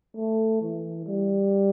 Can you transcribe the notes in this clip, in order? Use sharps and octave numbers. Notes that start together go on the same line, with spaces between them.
A3
E3
G3